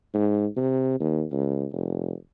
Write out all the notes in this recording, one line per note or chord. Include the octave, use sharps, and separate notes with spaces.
G#2
C3
D#2
C#2
F1